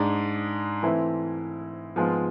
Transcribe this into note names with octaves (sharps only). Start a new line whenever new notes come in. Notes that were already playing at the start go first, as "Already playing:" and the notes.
Already playing: G#2 G#3 D4 G#4 D5
E3 A3 C4 E4
G#2 F3 G#3 B3 F4